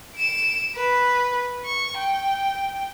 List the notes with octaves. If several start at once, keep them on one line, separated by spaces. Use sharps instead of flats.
D7 E7
B4
C#6
G5